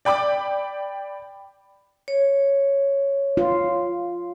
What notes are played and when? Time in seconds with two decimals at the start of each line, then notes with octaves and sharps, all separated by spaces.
0.05 D5 G5 B5 D6
2.08 C#5
3.37 F4